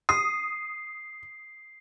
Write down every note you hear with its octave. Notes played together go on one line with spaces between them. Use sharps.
D#6 C7